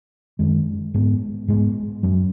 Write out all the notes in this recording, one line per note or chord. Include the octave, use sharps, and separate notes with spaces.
F#2 D#3 G#3
G#2 G#3 B3
G#2 G#3 B3
F#2 F#3 C#4